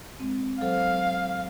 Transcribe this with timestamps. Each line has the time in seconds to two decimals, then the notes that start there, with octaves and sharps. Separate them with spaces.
0.20 G#3 C4
0.61 F#3 A4 C5 F5